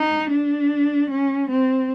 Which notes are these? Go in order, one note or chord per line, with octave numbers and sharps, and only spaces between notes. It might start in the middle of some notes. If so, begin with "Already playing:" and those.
Already playing: D#4
D4
C#4
C4